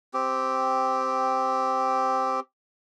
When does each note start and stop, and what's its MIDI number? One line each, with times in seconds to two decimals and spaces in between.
0.14 2.40 60
0.14 2.40 67